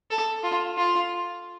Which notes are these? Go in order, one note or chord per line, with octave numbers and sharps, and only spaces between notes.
A4
F4
F4